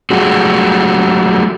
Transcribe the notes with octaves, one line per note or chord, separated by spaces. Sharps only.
F#3 G#3 A3 F#4 G4